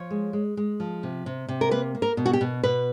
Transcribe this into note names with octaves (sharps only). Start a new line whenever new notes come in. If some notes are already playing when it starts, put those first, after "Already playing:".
Already playing: F3 C#5
G#3
G#3
G#3
F3
C3
C3
C3
A#4
A#3 B4
A#3
A#4
B2
F#4
G4
B2
B2 B4